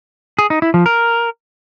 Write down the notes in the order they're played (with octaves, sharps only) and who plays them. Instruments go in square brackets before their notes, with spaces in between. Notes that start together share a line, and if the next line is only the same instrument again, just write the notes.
[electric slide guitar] G#4
D#4
E4
F3
A#4